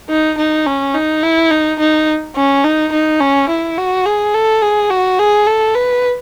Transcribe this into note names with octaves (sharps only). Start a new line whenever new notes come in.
D#4
D#4
C#4
D#4
E4
D#4
D#4
C#4
D#4
D#4
C#4
E4
F#4
G#4
A4
G#4
F#4
G#4
A4
B4